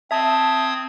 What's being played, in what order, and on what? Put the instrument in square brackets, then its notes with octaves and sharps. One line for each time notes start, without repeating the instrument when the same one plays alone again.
[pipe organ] C4 D#6 G#6 [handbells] E5 A5